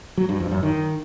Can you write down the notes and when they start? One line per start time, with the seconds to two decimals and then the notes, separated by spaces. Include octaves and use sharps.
0.17 F#3
0.29 G2
0.40 F2
0.51 F#2
0.63 D#3